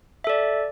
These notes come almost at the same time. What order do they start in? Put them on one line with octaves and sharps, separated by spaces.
E5 A4 D5